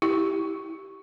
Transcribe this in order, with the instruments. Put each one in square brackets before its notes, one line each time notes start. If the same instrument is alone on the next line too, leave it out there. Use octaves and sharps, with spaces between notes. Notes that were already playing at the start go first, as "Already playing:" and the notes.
[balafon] E4 G4